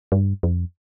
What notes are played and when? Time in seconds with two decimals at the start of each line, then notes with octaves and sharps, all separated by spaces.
0.12 G2
0.43 F2